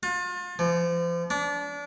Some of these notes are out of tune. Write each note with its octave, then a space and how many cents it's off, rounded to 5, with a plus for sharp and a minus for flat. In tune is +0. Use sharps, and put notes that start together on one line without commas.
F4 +35
F3 -35
D4 -30